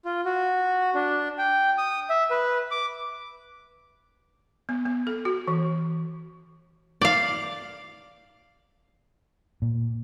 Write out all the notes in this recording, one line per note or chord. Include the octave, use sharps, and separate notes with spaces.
F4
F#4
D4
G5
D#6
E5
B4
D6
B3
B3
A4
F#4
E3
D5 F5
A#2